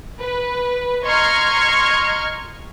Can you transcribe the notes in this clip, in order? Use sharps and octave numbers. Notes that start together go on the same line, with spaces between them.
B4
D#5 A#5 C6 C#6 F6 G#6